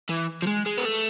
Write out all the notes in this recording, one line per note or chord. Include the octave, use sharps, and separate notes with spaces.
E3
F3
G#3
G#3
B3
A3